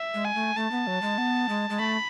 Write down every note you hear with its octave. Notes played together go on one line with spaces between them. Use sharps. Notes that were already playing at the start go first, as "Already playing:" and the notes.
Already playing: E5
G#3
G#5
A3
A3 A5
B3
F#3
G#3
B3
G#3
G#3
A3 B5